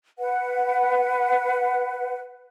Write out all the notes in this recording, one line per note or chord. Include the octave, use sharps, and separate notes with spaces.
B4 F#5